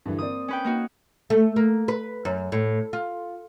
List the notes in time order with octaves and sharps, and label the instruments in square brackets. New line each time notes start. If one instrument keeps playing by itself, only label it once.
[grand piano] G2 D3 E3
[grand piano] A#3 C4 D5 [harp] D#6
[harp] C#4 B4 G5
A#3 D#4 F#4
[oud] A3
A#3
B4
F#2
A2
F4